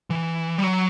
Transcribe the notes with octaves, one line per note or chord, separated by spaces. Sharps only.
E3
G3
F#3